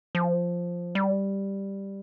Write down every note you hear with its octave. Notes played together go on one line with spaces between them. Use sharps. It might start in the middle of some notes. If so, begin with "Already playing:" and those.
F3
G3